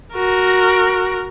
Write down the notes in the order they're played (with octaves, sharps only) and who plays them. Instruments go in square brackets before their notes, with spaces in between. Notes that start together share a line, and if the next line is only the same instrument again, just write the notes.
[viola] F#4 A#4